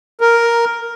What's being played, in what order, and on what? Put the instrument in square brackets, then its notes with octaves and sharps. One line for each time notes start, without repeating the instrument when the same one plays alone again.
[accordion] A#4